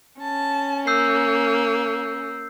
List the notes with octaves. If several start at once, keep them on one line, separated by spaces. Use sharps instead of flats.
C#4 A5
A#3 E6 G6 C7